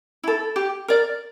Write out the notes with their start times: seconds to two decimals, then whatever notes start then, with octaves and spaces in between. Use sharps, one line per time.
0.23 E4 A4
0.56 G4
0.88 A#4 D5